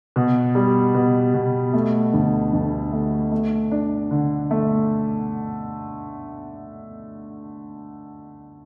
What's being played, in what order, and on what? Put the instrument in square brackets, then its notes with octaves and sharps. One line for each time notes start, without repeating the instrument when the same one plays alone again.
[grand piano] B2
G3
B2
B2
A3
D2
D2
A3
A3
D4
D3
A3